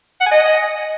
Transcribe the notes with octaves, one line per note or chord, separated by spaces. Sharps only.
F#5
G#5
D#5